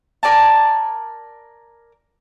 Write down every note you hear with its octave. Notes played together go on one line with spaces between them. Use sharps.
A#4 D5 G#5 A5